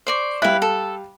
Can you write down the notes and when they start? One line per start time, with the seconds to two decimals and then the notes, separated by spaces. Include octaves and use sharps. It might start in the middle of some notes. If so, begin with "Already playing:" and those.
0.07 C5 D5 C#6
0.42 G3 E4 B4 F5 F#6
0.62 A4